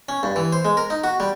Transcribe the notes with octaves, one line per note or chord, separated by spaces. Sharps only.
C#4
G2
E3
C5
G#3
A#4
D#4
F#4
G3